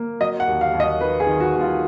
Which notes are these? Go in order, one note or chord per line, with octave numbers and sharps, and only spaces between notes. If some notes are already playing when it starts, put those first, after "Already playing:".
Already playing: A#3
F#3 D#5
F#5
D#2
F5
D#2
D#5
D#3 B4
G#4
D#3
F#4
D#2
F4